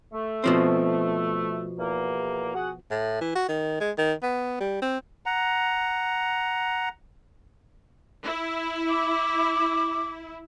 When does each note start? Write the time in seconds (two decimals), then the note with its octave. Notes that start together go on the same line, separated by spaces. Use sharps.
0.12 A3
0.44 B2 F3 C4
1.78 E2 A#3
2.55 F#4 G#4 F#5
2.91 A2
3.21 E3
3.35 F#4
3.48 D#3
3.80 G#3
3.98 D#3
4.22 B3
4.60 G3
4.82 C4
5.26 F#5 A#5
8.24 E4
8.90 D6